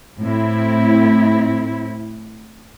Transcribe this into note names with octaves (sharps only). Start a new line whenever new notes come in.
A2 C4 E4